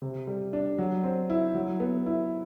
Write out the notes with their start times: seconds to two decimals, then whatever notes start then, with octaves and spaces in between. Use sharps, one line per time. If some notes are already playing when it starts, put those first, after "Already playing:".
0.02 C3
0.27 G3
0.53 D4
0.78 F#3
1.04 C4
1.30 E4
1.55 F#3
1.80 B3
2.06 E4